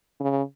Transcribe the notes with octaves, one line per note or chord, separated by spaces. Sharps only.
C#3